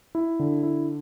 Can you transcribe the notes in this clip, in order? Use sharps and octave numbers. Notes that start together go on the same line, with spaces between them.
E4
D3
E4